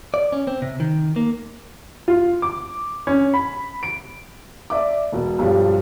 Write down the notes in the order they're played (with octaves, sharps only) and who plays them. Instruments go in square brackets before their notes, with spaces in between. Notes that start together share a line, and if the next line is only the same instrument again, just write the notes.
[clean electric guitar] D5
C#4
C4
C3
D#3
A#3
[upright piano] F4
D6
C#4
B5
D7
[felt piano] D5 E5 D6
E1 B2
B1 G2 F3 G3